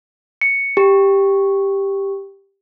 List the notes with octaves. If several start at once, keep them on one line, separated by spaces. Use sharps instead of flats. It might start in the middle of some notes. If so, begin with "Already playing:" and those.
C#7
G4